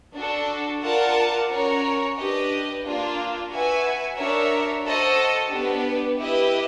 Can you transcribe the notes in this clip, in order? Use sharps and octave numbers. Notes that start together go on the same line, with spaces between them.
D4 F#4 A4
F4 A#4 D5 F#5 A5
C#4 F#4 A#4 C#5
D4 G4 B4 D#5
A#3 D4 F4
F#4 B4 E5 G#5
D4 F#4 A#4 C#5 E5
F#4 A4 C5 D#5
B3 D4 G4 B4
E4 G4 B4 D#5